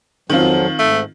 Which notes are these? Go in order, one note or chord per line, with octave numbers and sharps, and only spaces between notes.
F2 D#3 F3 F#3 C4 F4
G#2 A3